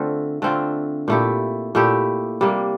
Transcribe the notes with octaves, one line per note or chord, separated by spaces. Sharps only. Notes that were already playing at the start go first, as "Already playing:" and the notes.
Already playing: D3 A3 C4 F4
D3 A3 C4 F4
A#2 A3 E4 G4
A#2 A3 E4 G4
C3 G3 A#3